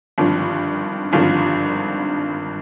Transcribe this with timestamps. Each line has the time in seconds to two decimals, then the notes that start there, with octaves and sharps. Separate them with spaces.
0.18 G#1 G2 D3 F3
1.12 G#1 G2 D3 F3 F4